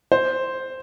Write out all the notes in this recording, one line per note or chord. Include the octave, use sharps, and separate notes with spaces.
C5